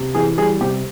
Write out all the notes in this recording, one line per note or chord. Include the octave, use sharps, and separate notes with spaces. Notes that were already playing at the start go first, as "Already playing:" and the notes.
Already playing: C3
E3 G#4
G3 G#4
C3 G4